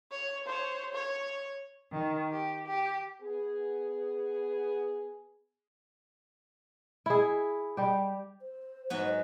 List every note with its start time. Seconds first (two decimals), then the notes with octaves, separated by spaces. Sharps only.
0.11 C#5
0.46 C5 C#5
0.94 C#5
1.92 D#3
2.30 G4
2.66 G4
3.22 B3 G#4
7.06 E4 G#4
7.77 G3 G4
8.41 C5
8.90 G#2 F#3 B3